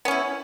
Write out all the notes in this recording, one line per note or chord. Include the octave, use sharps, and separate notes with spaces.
B3 C#4 E4